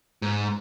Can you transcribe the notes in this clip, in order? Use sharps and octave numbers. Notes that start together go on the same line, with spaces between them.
G#2